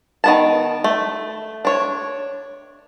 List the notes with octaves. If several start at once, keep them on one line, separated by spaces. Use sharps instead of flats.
D#3 B3 A5
A3
D4 C#5